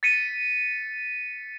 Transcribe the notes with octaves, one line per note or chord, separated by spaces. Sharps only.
A6 B6 C#7 D#7